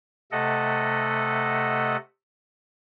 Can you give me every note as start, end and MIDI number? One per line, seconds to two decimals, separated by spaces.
0.32 1.97 48
0.32 1.97 57
0.32 1.97 69
0.32 1.97 75
0.32 1.97 78